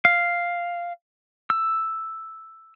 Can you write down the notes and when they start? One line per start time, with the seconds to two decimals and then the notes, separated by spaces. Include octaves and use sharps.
0.05 F5
1.50 E6